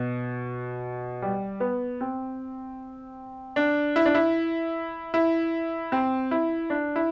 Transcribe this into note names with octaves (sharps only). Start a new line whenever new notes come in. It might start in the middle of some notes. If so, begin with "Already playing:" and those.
Already playing: B2
G3
B3
C4
D4
E4
D4
E4
E4
C4
E4
D4
E4